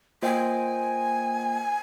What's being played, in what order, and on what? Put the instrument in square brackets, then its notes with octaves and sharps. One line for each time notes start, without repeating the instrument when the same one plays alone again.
[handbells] A#3 F4 C5 D#5 G5 [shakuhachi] G#5